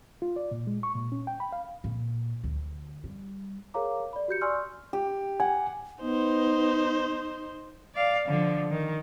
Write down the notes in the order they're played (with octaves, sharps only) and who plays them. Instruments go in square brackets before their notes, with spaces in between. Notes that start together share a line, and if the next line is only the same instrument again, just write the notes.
[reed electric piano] F4
D5
A#2
G#3
C#6
A#2
C#4
G5
B5
F5
[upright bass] A#2
D2
G3
[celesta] G#4 A#4 C#5 F5 A#5 D6
D5 B5
F#4 G4 G6 C#7
D5 G#5 C6 C#6 E6 F6
[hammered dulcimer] G4
[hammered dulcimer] F#5 [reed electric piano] G#5
[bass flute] B3 [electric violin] D#4 C5
[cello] D5 F5
D3 F3
D#3